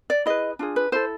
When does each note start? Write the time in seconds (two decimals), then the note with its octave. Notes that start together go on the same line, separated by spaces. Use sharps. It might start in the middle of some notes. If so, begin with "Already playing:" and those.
0.10 D5
0.26 E4 G#4 B4 D#5
0.59 D4 F4 G#4
0.76 B4
0.92 E4 A4 C5